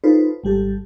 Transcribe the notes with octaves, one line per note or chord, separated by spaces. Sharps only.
D#4 F4 A4 B4 C5
G#1 G3 G4 A4